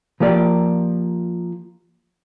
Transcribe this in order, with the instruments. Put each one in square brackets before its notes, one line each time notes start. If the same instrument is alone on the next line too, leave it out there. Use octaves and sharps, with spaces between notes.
[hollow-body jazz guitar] F3 A#3 G4 D5